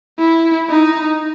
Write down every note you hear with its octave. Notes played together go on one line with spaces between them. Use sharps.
E4
D#4